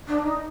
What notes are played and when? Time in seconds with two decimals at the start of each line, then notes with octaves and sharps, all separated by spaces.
0.08 D4
0.23 D#4